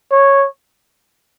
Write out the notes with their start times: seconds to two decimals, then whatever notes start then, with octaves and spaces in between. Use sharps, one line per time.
0.11 C#5